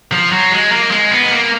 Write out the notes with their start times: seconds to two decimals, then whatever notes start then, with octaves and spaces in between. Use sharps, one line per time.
0.12 F3
0.32 F#3
0.52 G#3
0.72 A#3
0.91 G#3
1.11 B3
1.25 G#3
1.31 A#3